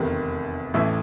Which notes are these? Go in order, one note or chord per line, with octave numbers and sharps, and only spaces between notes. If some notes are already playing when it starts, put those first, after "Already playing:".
Already playing: F1 E2 C3 D#3
A1 A2 E3 E4 E5